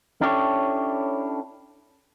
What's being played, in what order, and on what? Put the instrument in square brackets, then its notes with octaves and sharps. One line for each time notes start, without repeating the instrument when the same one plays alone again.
[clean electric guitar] C#4 D4 E4 G4 A4 C#5